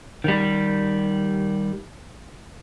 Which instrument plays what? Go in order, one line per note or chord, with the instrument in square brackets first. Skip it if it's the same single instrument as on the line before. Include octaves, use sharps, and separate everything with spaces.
[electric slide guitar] D#3 G3